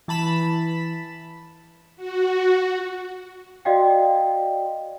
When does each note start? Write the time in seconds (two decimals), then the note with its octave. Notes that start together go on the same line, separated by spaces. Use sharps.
0.08 E3 A5 B5 E7
1.96 F#4
3.65 F#4 D5 D#5 F5 G5